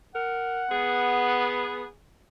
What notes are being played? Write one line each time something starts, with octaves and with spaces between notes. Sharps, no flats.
A#4 F#5
B3 G#4